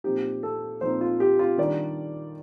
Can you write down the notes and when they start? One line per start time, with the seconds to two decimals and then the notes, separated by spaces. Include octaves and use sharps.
0.04 A#2 F3 C4 D#4 G4
0.43 A4
0.81 A#2 F3 C4 D#4 C5
1.01 F4
1.20 G4
1.39 F4
1.58 D#3 G3 D4 D5